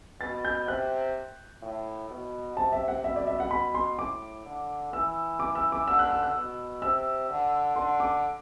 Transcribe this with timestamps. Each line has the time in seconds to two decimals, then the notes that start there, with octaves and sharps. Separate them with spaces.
0.20 B2 A6
0.45 G6
0.67 C3 F#6
1.62 A2
2.10 B2
2.56 C3 A5
2.73 E5
2.88 F#5
3.04 B2 E5
3.16 D5
3.27 E5
3.40 F#5
3.51 B5
3.75 C6
3.99 A2 D6
4.45 D3
4.93 E3 E6
5.40 D6
5.55 E6
5.72 D6
5.87 D3 E6
5.99 F#6
6.11 E6
6.23 F#6
6.35 B2
6.82 C3 E6
7.30 D3
7.76 D3 C6
8.00 D6